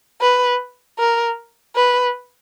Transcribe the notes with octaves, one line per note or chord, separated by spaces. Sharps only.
B4
A#4
B4